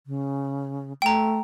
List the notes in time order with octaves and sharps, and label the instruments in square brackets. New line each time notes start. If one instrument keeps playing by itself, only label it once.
[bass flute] C#3
[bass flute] A3 [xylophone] G5 A#5